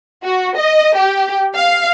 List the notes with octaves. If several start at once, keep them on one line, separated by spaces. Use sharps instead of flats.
F#4
D#5
G4
F5